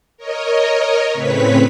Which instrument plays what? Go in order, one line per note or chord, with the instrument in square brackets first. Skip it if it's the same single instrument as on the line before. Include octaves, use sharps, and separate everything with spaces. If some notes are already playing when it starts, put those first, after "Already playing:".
[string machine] A#4 C#5 D#5
A2 C#3 C4 B4 C#5 B6